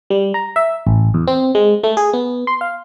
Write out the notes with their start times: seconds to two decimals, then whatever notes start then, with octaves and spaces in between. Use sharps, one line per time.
0.10 G3
0.34 A#5
0.56 E5
0.87 A1
1.14 E2
1.27 C4
1.55 G#3
1.83 A3
1.97 G#4
2.13 B3
2.47 C6
2.61 F5